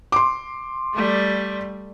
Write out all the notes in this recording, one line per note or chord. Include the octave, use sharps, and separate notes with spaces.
C6 D6
G3 A3